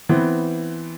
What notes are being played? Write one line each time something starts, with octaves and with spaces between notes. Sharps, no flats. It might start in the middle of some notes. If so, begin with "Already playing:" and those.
E3 B3 C4